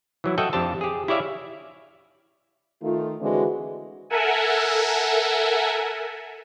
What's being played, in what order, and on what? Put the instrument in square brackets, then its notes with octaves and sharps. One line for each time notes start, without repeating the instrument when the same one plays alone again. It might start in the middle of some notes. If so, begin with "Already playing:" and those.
[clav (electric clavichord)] E3 F#3 E4
F#4 A4 D#5 E5 F#5 G5
F2 D4 G4 C5 A5
G4 G#4
E4 G4 C#5 D5 E5 F5
[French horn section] D#3 A3 F4
D3 E3 G#3 C4 F#4
[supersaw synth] A4 A#4 E5 F#5 G#5